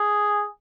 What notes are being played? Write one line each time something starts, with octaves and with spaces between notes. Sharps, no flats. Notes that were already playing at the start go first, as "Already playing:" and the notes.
Already playing: G#4